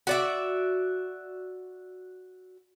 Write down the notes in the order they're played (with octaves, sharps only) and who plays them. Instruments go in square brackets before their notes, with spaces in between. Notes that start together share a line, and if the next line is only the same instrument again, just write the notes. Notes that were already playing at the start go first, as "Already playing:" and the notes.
[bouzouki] F#4 D5 E5